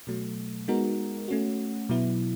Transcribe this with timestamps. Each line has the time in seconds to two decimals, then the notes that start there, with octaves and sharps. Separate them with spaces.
0.07 B2 F#3 A3
0.68 G#3 B3 D#4 F#4 A#4
1.28 A3 C#4 F#4
1.89 B2 F#3 B3 E4